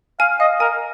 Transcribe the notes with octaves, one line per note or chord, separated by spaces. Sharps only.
F5 G#5
D#5 F5
A#4 G#5